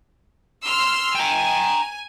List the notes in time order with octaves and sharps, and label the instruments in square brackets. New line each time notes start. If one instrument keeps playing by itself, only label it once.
[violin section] C6 E6 F6
[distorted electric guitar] G5 A#5 [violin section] G#5